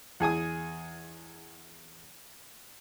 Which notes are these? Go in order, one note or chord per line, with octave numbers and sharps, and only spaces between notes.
E2 G#4 G#5 D#6